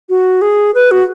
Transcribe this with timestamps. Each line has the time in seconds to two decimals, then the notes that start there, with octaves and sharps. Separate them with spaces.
0.09 F#4
0.42 G#4
0.75 B4
0.91 F#4